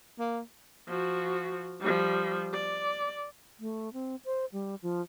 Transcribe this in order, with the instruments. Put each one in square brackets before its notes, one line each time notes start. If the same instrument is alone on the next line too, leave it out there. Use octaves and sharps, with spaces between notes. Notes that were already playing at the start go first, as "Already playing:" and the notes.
[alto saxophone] A#3
[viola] F3 F#4
F3 G3
D5
[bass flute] A3
C4
C5
G3
F3